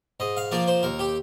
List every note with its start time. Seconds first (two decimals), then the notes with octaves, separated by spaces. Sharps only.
0.20 G#2 D#5
0.37 F5
0.52 F3 A#3 D5
0.68 C5
0.83 D#2 A#4
0.99 G4